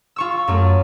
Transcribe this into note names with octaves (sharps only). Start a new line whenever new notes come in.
F4 C#6 E6
F#2 A3